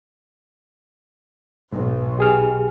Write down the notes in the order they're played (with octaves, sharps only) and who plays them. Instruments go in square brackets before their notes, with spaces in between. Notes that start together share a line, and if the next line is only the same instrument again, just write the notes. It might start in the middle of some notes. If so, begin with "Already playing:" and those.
[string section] B1 [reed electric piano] G#2
[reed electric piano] G4 G#4 F6